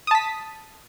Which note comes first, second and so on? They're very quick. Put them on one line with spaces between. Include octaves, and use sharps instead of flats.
D#6 A5 B6